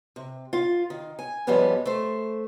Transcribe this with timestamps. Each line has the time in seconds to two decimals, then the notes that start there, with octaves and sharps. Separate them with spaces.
0.16 C3
0.53 F4
0.90 D#3
1.19 G#5
1.47 G#2 F3 G3 G#3 B3 C#4
1.86 A3 C5